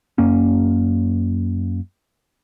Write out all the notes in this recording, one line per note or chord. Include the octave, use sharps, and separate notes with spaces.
F#2 A#3 C#4